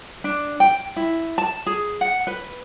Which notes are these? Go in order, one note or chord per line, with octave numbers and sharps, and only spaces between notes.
D4
G5
E4
A5
G#4
F#5
B4